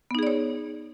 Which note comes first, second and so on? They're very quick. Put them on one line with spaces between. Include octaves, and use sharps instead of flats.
B3 D#4 G#4 D5 C#5